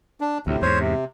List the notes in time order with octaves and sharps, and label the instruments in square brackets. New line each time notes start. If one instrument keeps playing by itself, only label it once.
[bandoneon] D4
[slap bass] D2 [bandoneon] A2 C3
[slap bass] E2 G#2 [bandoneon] C5 C#5
[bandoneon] C3